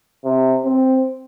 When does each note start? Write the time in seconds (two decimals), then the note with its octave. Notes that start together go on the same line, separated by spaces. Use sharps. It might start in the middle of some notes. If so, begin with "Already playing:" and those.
0.25 C3
0.65 C4